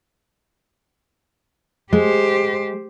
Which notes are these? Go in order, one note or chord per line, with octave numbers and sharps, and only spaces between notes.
G#3 G4 C5